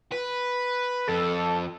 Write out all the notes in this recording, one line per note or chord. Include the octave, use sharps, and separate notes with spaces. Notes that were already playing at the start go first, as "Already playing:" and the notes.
B4
F2 A4